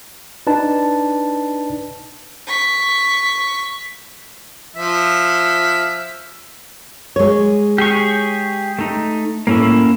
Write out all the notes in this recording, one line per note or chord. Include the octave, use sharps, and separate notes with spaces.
D4 D#4 B4 A5
C#6 B6
F3 E5
G#3 C#5
G4 G#4 C#6
A3 D#4
A2 A#3 C#4 E4